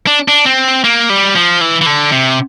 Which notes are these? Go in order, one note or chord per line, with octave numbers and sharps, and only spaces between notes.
D4
D4
C4
A#3
G3
F3
E3
E3
D3
C3